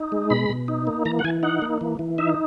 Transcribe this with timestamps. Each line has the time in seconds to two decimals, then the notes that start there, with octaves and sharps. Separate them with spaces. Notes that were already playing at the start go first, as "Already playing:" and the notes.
Already playing: D#4
0.12 G#3
0.30 B2 B5
0.49 B2
0.68 D#4
0.87 A#3
1.05 E3 A#5
1.19 F#5
1.24 E3 G#5
1.43 D#4 F#5
1.62 A#3
1.81 E3
1.99 E3
2.18 D#4 E5